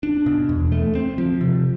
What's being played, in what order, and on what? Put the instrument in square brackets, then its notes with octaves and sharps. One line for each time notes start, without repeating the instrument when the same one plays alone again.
[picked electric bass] D4
B2
E2
A3
C4
F3
C3